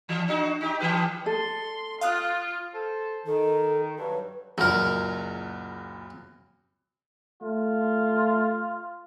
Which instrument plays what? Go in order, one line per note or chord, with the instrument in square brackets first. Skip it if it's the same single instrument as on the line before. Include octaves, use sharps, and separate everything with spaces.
[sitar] E3
D4 D#4 F#4
D#4 G4
E3 G4 B4
[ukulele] A4 [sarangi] C6
[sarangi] F4 [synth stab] F5 D#6 F#6
[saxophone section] A4 C5
[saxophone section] D#3 [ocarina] A4
[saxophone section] G2 F#3 [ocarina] B4
[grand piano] F#1 C#2 A#2 [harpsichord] F#3 A#4
[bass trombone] A3 [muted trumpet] F4